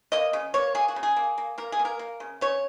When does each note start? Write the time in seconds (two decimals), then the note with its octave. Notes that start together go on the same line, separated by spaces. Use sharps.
0.12 A#3 D#5
0.33 C#3
0.54 A#3 C#5
0.75 A#3 G#4
0.88 F#4
0.96 C#3
1.03 G#4
1.17 A#3
1.38 A#3
1.58 A#3 A#4
1.72 G#4
1.79 A#3
1.85 A#4
1.99 A#3
2.20 C#3
2.41 C#3 C#5